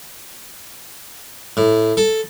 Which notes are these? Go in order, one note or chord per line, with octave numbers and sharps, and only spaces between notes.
A2
A4